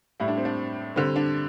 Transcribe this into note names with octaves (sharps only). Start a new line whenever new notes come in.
A2 G3 E4
D4
C4
D4
D3 G3 C4
D4